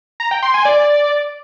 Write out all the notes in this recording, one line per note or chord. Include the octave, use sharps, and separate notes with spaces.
A#5
G5
C6
G#5
D5